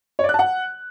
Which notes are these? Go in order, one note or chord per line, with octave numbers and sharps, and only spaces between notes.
C#5
D5
F#6
A5
F#5